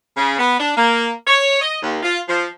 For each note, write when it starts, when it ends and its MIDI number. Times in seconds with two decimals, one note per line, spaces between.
0.16 0.35 49
0.39 0.58 59
0.60 0.71 62
0.77 1.10 58
1.27 1.58 73
1.62 1.77 75
1.83 1.99 39
2.03 2.18 65
2.28 2.47 53